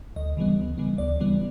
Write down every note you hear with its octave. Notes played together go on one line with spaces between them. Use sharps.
D2 D#5
C#3 E3 G3 B3
D2
C#3 E3 G3 B3
D2 D5
C#3 E3 G3 B3